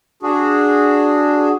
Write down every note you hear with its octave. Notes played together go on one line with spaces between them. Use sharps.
D4 F#4 G#4